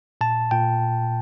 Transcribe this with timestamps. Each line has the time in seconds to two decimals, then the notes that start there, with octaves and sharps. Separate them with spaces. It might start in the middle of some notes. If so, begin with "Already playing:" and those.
0.21 A#2 A5
0.51 A#2 G5